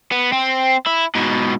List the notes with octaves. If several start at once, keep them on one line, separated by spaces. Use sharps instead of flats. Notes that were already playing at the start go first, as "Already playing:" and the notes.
B3
C4
E4
G#2 B2